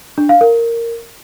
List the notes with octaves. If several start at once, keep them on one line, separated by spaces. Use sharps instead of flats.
D4
F5
A#4